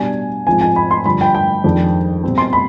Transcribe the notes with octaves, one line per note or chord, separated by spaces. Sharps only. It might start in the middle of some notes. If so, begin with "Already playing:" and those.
Already playing: B2 G3 D4 G#5
G#2 F3 C4 G#5
G#5
B5
C6
G2 D3 F3 B5
G5
G5
F2 D#3 G#3 D4
B2 G3 C4
C6
B5